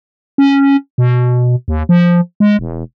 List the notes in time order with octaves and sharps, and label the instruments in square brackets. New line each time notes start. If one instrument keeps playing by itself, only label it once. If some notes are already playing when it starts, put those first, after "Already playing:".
[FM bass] C#4
B2
D#2
F3
G#3
E1